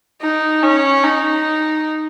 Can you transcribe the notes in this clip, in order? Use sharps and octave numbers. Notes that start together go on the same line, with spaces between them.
D#4
C#4
D#4